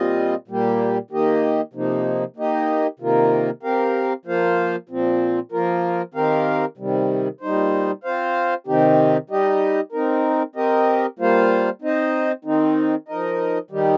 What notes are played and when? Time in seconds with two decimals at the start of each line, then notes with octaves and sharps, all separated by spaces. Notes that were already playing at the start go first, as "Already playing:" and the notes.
Already playing: A#2 G3 C4 F4 D#5
0.48 A#2 G3 A#3 G4
1.11 D#3 A#3 G4 D#5
1.73 C3 F3 A#3 D#4
2.36 A#3 D#4 G4 D#5
3.00 C3 D#3 A#3 F4 A#4
3.63 C4 G4 A#4 F5
4.26 F3 A#3 F4 C5 F5
4.89 A#2 F3 C4
5.52 F3 A#3 F4 A#4
6.14 D#3 C4 G4 A#4 F5
6.78 C3 D#3 G3
7.41 A#2 G3 D#4 C5
8.04 C4 F4 C5 F5
8.67 C3 D#3 C4 D#4 G4
9.30 G3 D#4 G4 D#5
9.92 C4 D#4 A#4
10.56 C4 G4 A#4 D#5
11.19 G3 A#3 F4 C5 F5
11.82 C4 D#4 C5 D#5
12.45 D#3 C4 D#4
13.08 F3 D#4 A#4 D#5
13.71 D#3 G3 D#4 G4